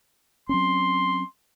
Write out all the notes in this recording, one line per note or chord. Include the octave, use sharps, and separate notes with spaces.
F#3 C4 C#4 C6